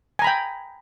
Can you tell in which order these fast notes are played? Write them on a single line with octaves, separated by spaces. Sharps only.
G#5 A#5 B5 G5